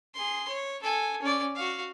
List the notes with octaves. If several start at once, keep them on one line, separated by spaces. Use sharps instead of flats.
G#4 C6
C#5
A4 G#5
C#4 D5
F#4 F5